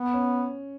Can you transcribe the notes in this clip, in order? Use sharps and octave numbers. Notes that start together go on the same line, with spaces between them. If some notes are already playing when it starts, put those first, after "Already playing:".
Already playing: B3
C#4